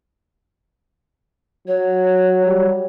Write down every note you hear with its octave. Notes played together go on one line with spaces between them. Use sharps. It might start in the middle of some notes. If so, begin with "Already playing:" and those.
F#3 C#5
G3